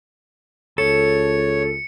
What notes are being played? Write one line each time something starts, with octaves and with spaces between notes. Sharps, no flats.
C#2 A4 C#5 A5 C#7